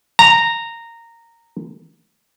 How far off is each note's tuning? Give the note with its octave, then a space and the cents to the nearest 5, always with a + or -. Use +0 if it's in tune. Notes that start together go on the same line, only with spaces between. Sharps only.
A#5 -10